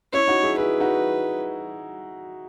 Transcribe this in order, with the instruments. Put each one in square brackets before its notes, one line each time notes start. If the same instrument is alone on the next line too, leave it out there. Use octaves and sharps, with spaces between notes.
[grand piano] C#4 E4 [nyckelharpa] C#5
[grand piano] D#4 F#4
E4 G#4
[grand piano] E4 G#4 [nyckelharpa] B4
[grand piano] D#4 F#4